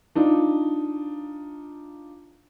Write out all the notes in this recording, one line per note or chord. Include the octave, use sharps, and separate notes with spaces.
D4 D#4 F4